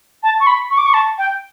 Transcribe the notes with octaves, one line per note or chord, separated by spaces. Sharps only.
A5
C#6
B5
C#6
D6
C#6
A5
G5